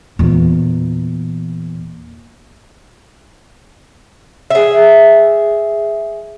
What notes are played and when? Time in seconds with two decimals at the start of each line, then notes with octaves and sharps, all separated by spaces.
0.19 E2 A#2
4.50 G#4 E5